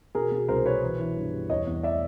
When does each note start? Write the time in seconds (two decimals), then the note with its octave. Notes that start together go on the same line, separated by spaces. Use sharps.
0.15 B2 G#4 A#4
0.32 B2
0.48 C2 A#4 C5
0.66 B2 B4 C#5
0.82 E3
0.99 E3
1.16 G2
1.33 G3
1.50 E2 C#5 D#5
1.67 E2
1.83 D5 E5